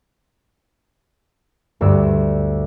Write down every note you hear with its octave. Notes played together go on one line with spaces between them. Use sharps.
D2 G2 D6 E6